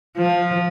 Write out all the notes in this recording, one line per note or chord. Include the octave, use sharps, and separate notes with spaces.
F3